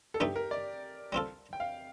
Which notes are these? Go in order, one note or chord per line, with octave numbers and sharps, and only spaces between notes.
A4
G2 D3 A3 D#4 G4
A#4
D5
G3 C4 F4 A4
G5
F5